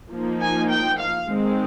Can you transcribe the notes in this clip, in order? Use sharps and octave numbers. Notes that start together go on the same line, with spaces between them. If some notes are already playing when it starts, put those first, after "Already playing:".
F3 A#3 D#4
G#5
G5
F5
D#3 G#3 C4